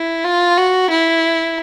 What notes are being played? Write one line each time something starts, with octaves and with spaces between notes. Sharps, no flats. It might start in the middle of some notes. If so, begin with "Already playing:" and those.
Already playing: E4
F4
F#4
E4